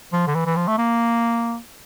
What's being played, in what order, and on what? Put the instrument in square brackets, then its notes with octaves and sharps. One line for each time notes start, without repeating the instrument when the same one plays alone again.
[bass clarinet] F3
D3
E3
E3
F3
A3
A#3